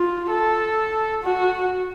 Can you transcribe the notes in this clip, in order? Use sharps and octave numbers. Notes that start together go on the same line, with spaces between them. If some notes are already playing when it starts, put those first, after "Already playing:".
Already playing: F4
A4
F#4